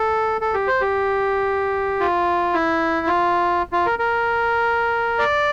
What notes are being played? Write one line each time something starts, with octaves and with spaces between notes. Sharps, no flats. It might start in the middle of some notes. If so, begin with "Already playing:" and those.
Already playing: A4
A4
G4
C5
G4
F4
E4
F4
F4
A#4
A#4
D5